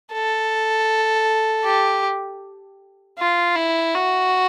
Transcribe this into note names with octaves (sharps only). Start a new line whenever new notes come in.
A4
G4
F4
E4
F#4